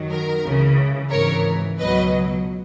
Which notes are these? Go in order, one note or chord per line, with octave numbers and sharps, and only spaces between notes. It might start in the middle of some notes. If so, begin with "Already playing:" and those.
Already playing: F#2 D#3 F#3
A#4
C#2 C#3 E3
G#1 G#2 E3 A#4 C#5
C#2 B2 F#3 B4 D#5